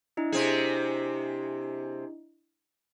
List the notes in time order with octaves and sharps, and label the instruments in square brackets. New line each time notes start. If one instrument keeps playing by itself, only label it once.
[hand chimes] D4 E4 D#5
[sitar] C3 C4 G#4